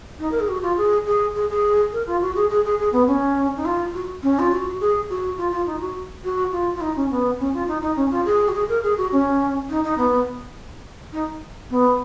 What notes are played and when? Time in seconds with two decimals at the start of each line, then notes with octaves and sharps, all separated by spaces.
0.19 D#4
0.31 A#4
0.39 G#4
0.48 F#4
0.62 F4
0.77 G#4
1.06 G#4
1.35 G#4
1.49 G#4
1.92 A#4
2.06 F4
2.21 F#4
2.35 G#4
2.49 G#4
2.64 G#4
2.78 G#4
2.92 B3
3.07 C#4
3.56 D#4
3.65 F4
3.94 F#4
4.22 C#4
4.39 F4
4.51 F#4
4.80 G#4
5.09 F#4
5.37 F4
5.51 F4
5.66 D#4
5.80 F#4
6.23 F#4
6.52 F4
6.74 F4
6.81 D#4
6.96 C#4
7.10 B3
7.39 C#4
7.53 F4
7.67 D#4
7.81 D#4
7.96 C#4
8.10 F4
8.25 G#4
8.48 F#4
8.53 G#4
8.68 A#4
8.83 G#4
8.97 F#4
9.12 C#4
9.69 D#4
9.84 D#4
9.97 B3
11.12 D#4
11.70 B3